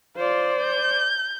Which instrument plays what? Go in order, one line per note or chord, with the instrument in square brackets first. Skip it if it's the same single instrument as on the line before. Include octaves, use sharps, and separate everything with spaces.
[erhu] F4 [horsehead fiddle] C5 D5
[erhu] G6